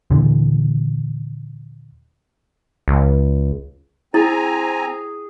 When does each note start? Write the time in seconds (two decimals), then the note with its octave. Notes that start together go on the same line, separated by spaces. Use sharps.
0.11 D#2 A#2 D3 E3
2.88 C#2
4.14 C4 E4 G#4 G#5 A#5